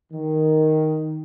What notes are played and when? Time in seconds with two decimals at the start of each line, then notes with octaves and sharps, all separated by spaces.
0.13 D#3